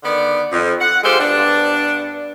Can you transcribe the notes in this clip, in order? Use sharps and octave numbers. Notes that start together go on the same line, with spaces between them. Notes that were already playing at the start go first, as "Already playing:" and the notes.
D3 D#3 B3 D5
F2
F#5
G#3 F4 G4 A4 C5
G2 B3 D4